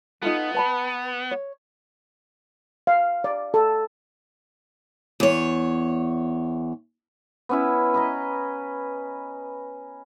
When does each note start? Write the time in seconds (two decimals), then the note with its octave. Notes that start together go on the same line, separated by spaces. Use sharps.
0.22 B3 D#4 F4 A4
0.54 B4 A5 B5
1.31 C#5
2.87 F5
3.24 D5
3.54 A4
5.20 E2 C#5
7.49 B3 C#4 E4
7.94 B4 D#5 A#5